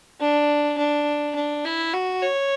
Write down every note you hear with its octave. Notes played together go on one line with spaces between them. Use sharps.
D4
D4
D4
E4
F#4
C#5